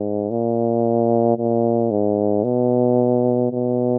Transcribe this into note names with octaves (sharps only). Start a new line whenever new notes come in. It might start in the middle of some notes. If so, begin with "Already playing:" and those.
Already playing: G#2
A#2
A#2
G#2
B2
B2